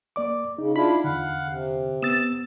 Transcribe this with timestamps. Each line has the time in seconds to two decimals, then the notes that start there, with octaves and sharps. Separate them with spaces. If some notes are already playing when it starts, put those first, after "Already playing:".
0.16 A#3 D5 D6
0.58 C#3 D#4
0.76 D4 E4 F4 B5
1.04 E2 D3 F5 F#5
1.50 C3
2.02 B3 D#6 E6 A6 E7